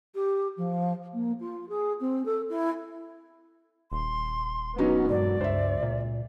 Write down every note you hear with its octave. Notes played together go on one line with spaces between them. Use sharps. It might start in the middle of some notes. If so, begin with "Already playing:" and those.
G4
F3
A#3
F4
G#4
C4
A4
E4
D#1 C6
F#3 B3 C#4 D#4
E1 G2 F#3 D5
C#2 G2 C5 E5
A#2